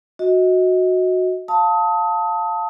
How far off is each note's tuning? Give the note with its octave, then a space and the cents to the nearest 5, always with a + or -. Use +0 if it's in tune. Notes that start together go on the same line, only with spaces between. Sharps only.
F#4 -10 D#5 +25
F5 +10 A5 +10 D#6 +30